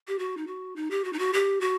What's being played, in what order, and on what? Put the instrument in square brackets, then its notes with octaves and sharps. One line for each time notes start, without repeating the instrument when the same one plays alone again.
[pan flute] G4
F#4
D#4
F#4
D#4
G4
F#4
D#4
F#4
G4
F#4